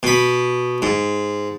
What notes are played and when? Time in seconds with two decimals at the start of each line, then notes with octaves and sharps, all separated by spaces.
0.03 B2 B5
0.82 G#2